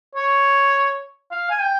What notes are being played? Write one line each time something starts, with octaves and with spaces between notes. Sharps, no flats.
C#5
F5
G#5
G5